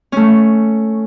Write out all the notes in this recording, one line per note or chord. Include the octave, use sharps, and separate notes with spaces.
A3 C#4